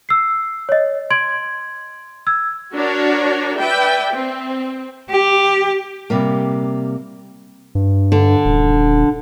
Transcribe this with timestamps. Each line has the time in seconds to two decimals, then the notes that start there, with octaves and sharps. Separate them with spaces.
0.09 E6 C7
0.69 C#5 D#5
1.10 C6 G#6 D7 F#7
2.27 E6 G#6
2.74 D4 F#4 A#4 C#5
3.58 B4 D5 E5 G5
4.12 C4
5.09 G4
6.10 C3 G3 A#3
7.75 G2
8.12 D3
8.45 D#1